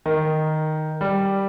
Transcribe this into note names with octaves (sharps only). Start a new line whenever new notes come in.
D#3
G3